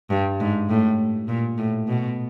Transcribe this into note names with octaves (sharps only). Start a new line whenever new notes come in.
G2
G#2
A2
A#2
A2
B2